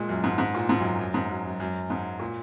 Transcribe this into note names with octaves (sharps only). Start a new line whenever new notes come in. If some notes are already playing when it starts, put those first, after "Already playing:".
Already playing: A#2 G#3
F#2
G#2
G#2
A#2
G#2
F#2
F#2
G#2
F#2
F#2
F#2
G#2
A#2